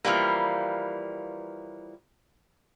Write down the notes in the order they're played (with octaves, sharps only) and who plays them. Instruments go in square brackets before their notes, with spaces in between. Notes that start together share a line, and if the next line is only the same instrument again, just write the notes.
[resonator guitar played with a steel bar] E3 F3 G3 A#3